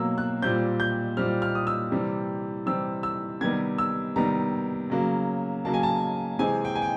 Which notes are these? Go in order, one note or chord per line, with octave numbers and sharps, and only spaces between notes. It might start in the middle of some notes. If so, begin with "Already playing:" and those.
Already playing: B2 F#3 A#3 E6
F#6
A#2 G3 C4 G6
G6
A#2 G3 C4 F6
F6
D#6
E6
C3 E3 G3 C4
C3 E3 G3 C4 E6
E6
C3 D#3 G3 B3 G#6
E6
C3 D#3 G3 B3 A#5
C#3 F#3 A#3
C#3 F#3 A#3 A5
G#5
A5
C3 E3 G#3 C4 G#5
G5
G#5
G5